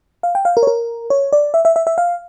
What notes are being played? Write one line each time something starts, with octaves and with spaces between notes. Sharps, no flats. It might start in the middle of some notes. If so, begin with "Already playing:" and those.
F5
G5
F5
A#4
C#5
A#4
C#5
D5
E5
E5
E5
E5
F5